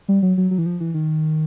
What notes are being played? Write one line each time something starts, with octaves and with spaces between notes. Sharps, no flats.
G3
F#3
F#3
F#3
E3
F3
E3
D#3